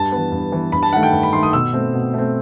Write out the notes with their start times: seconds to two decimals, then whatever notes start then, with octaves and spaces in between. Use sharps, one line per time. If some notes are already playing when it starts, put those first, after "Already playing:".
Already playing: G2 A5
0.12 E3 B3
0.32 G2
0.52 E3 B3
0.72 G2 B5
0.83 A5
0.93 D#3 A3 F#5
1.03 G5
1.13 G2
1.23 B5
1.33 D#3 A3 C6
1.43 D#6
1.53 B2 E6
1.73 A3 C4
1.94 B2
2.14 A3 C4